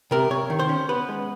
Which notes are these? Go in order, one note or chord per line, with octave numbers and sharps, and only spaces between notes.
C3 A#4
C3 C#5
D#3
C5
C#4
B3 B4
G#3